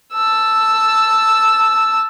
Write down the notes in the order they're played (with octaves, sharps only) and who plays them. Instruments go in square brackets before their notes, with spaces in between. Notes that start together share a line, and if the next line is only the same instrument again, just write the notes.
[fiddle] A5 E6